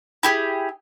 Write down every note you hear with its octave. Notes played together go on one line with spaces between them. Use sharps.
E4 G4 G#4